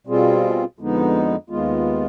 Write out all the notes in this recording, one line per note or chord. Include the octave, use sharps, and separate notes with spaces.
B2 G3 C4 F4 G#4
F2 D3 G#3 B3 D#4
D#2 D#3 G#3 B3 F4